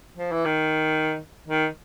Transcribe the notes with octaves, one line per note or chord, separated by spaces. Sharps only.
F3
E3
D#3
D#3